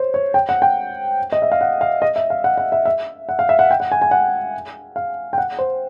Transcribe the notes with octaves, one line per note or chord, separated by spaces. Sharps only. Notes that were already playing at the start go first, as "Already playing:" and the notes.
Already playing: C5 C#5
C#5
G5
F#5
G5
D#5
E5
F5
F#5
F5
D#5
E5
F5
F#5
F#5
E5
E5
F#5
F5
E5
F#5
G5
F#5
G#5
G#5
F#5
F5
G5
F#5
C5